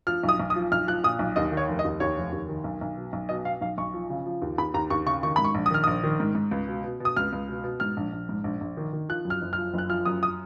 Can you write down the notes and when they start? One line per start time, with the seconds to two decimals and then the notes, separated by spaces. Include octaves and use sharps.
0.07 F3 F6
0.23 B1
0.29 D#6
0.40 B1
0.50 D#6
0.56 F3
0.72 B1 F6
0.87 F3 F#6
1.04 A#2 D#6
1.19 B1
1.36 D#2 D#5
1.52 D#3
1.57 C#5
1.68 F1
1.79 D#5
1.85 D#2
2.00 D#2 C#5
2.17 F1
2.32 D#2
2.48 D#3
2.64 B1
2.81 B1
2.97 B2
3.13 B1
3.29 B2 D#5
3.45 B2 F5
3.61 B1 F5
3.78 B1 C#6
3.94 F3
4.10 C#3
4.26 F3
4.42 D#2
4.58 D#2 B5
4.74 D#2 A#5
4.90 D#2 C#6
5.06 C#3 C#6
5.23 D#3 C#6
5.36 G#2 B5
5.44 C#6
5.55 A#1
5.66 D#6
5.71 D#3 F6
5.84 A#1 D#6
6.04 D#3
6.20 G#2
6.35 G#2
6.51 C#2
6.68 B2
6.84 B2
7.00 B2
7.05 D#6
7.16 C#2 F6
7.33 C#2
7.48 B2
7.64 B2
7.80 G#2 F6
7.97 A#1
8.13 A#1
8.29 G#2
8.44 A#1
8.61 A#1
8.77 D#3
8.93 D#3
9.09 F3 F#6
9.25 F#2
9.30 F6
9.41 F#1
9.53 F6
9.58 F3
9.74 F#1 F#6
9.89 F3 F6
10.05 F#2 D#6
10.23 D#6